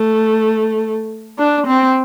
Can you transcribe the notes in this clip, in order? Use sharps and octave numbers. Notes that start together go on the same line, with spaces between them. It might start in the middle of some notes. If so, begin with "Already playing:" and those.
Already playing: A3
D4
C4